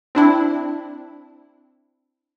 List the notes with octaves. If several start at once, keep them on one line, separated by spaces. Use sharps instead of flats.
C4 D4 E4